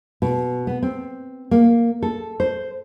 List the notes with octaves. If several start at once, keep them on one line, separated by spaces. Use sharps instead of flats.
B2
B3
C4
A#3
A4
C5